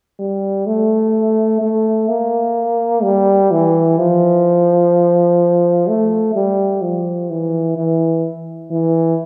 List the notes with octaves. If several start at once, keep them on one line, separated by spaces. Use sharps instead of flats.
G3
A3
A3
A#3
G3
E3
F3
A3
G3
F3
E3
E3
E3